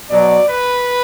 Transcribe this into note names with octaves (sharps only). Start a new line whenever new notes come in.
B2 F#3 D5
B4